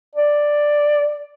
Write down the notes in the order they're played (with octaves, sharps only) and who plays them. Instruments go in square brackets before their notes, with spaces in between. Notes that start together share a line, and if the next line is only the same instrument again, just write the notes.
[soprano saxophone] D5